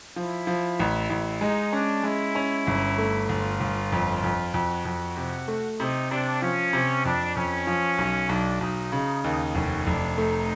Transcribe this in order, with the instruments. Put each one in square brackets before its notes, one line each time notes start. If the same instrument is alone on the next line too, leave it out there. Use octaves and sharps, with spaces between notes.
[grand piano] F3 [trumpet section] E4
[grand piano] F3
A1
A1
[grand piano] G#3 [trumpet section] D#4
[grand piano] C#4 [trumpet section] D4
[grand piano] G#3 [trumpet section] E4
[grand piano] C#4
G1
A3
[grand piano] G1 [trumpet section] F4
[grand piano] G1
F2
F2
[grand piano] F2 [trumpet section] F#4
[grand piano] F2
C3
A3
[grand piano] C3 [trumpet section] D#4
[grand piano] C3 [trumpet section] D4
[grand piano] F3 [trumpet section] C#4
[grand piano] C3
[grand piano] F2 [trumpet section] D4
[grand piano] F2 [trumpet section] C#4
[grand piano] F3
B1
[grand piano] B1 [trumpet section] D4
[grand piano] B1 [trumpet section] D#4
[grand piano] C#3 [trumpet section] D#4
[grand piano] D#2 [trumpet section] D#4
[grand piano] F1 [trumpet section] C#4
[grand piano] F1 [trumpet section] D4
[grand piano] A3 [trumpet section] D#4